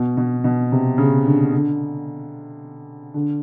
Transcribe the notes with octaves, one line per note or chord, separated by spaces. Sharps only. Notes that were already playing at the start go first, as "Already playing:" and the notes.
Already playing: B2
B2
B2
C3
C#3
D3
D3
D3